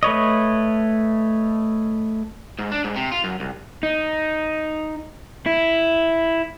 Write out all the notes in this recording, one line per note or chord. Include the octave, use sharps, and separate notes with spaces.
A3 B4 C#5 D#5
G#2
D4
G#2
C3
F4
F#2
C2
D#4
E4